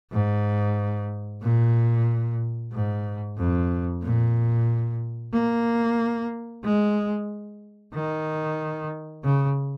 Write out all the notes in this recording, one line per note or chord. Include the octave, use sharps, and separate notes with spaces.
G#2
A#2
G#2
F2
A#2
A#3
G#3
D#3
C#3